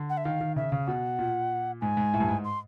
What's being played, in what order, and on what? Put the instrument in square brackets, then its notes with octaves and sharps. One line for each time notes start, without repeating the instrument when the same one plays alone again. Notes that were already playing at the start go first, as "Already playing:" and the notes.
Already playing: [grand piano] D3
[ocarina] F#5
E5
[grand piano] D#3 [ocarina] F5
[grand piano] D#3
[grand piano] C#3 [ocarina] E5
[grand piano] C#3 [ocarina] F5
[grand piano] B2 [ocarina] F#5
[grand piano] A#2
[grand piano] G#2 [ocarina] G#5
[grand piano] G#2
A2
G2
G#2
[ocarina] C6